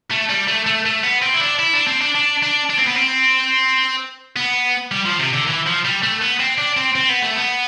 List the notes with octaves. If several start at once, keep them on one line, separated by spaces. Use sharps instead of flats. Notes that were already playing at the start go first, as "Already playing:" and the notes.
A3
G3
A3
A3
A3
B3
C4
E4
D4
E4
D4
C4
D4
D4
D4
D4
C4
B3
C4
B3
G3
F3
C3
D3
E3
F3
G3
A3
B3
C4
D4
C4
C4
B3
A3
B3